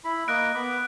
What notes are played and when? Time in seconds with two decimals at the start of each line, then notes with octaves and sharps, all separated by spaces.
0.04 E4 B5
0.28 A#3 D#5 F#6 D7
0.55 B3 B5 D6